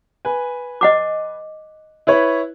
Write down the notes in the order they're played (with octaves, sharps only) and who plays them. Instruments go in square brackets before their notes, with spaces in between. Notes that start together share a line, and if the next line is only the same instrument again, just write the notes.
[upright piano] B4 G#5
[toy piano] D#5 F#5 D6
[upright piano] E4 B4 C#5